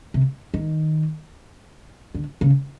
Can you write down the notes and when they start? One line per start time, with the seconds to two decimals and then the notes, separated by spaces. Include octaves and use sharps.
0.14 C3
0.54 D#3
2.14 D3
2.41 C#3